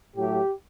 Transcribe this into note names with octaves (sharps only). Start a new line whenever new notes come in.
A2 F#3 A3 G4